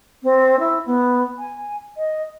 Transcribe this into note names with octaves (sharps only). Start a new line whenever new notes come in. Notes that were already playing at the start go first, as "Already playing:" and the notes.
C4
E4
B3
G#5
D#5